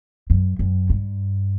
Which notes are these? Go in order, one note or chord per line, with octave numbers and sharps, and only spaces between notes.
F#2
F#2
G2